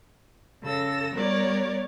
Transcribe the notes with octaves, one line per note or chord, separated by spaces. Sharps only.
C#3 A4 E6 A#6
G3 B3 A#4 C#5 D5